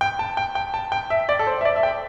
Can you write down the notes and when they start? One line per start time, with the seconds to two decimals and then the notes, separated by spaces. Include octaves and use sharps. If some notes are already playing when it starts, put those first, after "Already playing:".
0.01 G5
0.19 A5
0.37 G5
0.55 G5
0.74 A5
0.92 G5
1.10 E5
1.29 D5
1.39 A4
1.47 C5
1.61 E5
1.65 D5
1.76 E5
1.83 G5